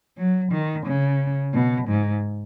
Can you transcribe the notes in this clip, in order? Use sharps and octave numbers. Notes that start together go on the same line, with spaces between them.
F#3
D#3
C#3
B2
G#2